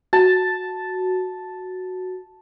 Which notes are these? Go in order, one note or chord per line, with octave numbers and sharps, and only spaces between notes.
F#4 A5